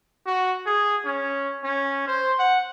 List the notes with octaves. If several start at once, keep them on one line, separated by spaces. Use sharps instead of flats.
F#4
G#4
C#4
C#4
C5
F#5